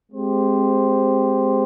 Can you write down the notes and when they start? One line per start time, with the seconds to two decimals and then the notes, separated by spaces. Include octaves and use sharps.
0.12 G#3 C4 G4 C5